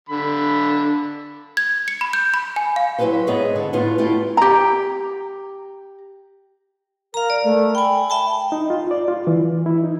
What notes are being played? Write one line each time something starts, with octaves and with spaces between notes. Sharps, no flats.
D3 B5
G#6
C#7
B5
G6
B5
G#5
F5
F#3 E4 F#4 G4 B4 C5
G#2 B3 G#4 C#5 D#5 E5
D3
A2 B3 E4 F4
A3 E4 F4 G4
G4 A#5
A#4 F5 A#5
D5
A3
G5 G#5 B5
E5 G5 A5
D#4
F4
D5
F4
E3
E4
D#4